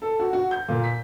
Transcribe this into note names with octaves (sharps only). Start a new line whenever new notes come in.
A4
F#4
F#4
G6
A#2
B6